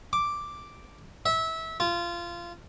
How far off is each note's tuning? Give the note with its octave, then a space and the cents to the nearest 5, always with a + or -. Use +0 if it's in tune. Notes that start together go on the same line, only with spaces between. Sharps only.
D6 +0
E5 -20
F4 -20